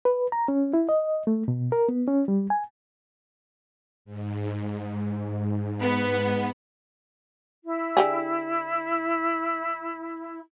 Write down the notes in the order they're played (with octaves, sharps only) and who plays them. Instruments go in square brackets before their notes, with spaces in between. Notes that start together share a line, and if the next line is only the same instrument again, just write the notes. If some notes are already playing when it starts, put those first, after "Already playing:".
[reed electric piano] B4
A#5
C#4
E4
D#5
A3
B2
A#4
B3
C#4
G3
G#5
[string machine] G#2
[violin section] B3
[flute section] E4
[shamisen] D3 G4 G#4